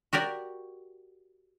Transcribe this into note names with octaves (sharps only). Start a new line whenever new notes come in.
F#4 G4 A#4 D5